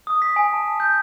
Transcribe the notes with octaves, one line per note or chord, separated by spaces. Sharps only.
D#6
B6
G#5
A5
G6